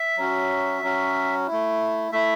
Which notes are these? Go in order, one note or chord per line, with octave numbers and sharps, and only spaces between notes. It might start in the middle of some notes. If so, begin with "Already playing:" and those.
Already playing: E5
F#3 C#4 F#4
F#3 C#4 F#4
E4
A3
A3 E4 E5